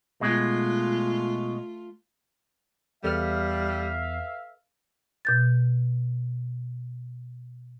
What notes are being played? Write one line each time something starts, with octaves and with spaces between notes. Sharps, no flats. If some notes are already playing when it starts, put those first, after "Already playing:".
B2 G#3 A3 F4
E2 G3 A4 B4 E5 F5 F6
B2 G6 A6